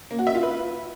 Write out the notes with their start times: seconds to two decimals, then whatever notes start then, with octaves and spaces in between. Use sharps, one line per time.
0.11 A#3
0.19 F#4
0.27 E5
0.35 F4
0.43 B4